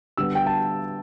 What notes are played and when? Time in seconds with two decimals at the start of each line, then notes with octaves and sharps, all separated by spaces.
0.17 D3 G3 B3 E6
0.35 G5
0.46 A5